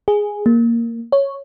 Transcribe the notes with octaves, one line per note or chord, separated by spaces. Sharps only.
G#4
A#3
C#5